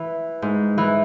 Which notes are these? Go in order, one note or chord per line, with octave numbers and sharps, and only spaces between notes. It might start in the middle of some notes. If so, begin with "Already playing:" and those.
Already playing: E3
G#2
E3